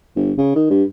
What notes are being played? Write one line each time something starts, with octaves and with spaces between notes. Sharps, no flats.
G1
C#3
D#3
G2